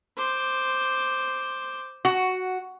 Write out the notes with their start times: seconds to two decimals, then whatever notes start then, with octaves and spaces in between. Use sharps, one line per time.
0.17 C5 D6
2.05 F#4